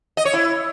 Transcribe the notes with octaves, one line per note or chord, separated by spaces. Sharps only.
D#5
C#5
E4